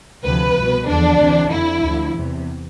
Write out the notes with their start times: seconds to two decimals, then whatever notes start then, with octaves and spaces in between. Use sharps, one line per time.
0.25 D2 C3 F3 B4
0.57 C2 B2
0.88 E2 D3 F3 D4
1.20 D2 C3 E3
1.52 F2 D3 F3 E4
1.83 D2 D3 F3
2.15 E2 C3 E3